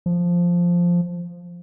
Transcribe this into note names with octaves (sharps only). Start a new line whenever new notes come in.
F3